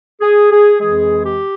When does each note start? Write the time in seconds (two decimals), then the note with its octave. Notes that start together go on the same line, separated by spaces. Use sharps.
0.21 G#4
0.51 G#4
0.80 F2 E3 G#3 G#4
1.24 G4